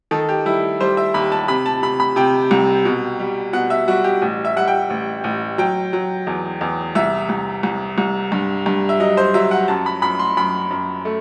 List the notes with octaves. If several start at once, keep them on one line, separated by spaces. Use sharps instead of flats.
D#3 A4
G4
G3 E4
G3 C5
E5
D#2 B5
A5
C3 B5
A5
C3 B5
B5
C3 G5
C2
B2
G3
B2 F#5
E5
G3 F#4
G4
A1
E5
G3 F#5
G5
A1
A1
F#3 G5
F#3
E2
E2
C2 E5
C2
C2
C2
G2
G2
E5
F#3 D#5
C5
F#3 E5
F#5
F#2 A5
B5
F#2 B5
C6
F#2 B5
F#2
A3